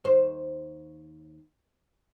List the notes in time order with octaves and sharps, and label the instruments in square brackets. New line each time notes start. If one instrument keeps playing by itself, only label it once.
[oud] D#2 C5